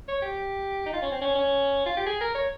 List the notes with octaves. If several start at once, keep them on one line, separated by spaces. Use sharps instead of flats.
C#5
G4
D#4
F4
C#4
C4
C#4
C#4
F4
G4
G#4
A#4
C#5